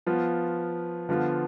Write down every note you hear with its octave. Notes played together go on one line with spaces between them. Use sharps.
F3 B3 F4
D3 F3 B3 F4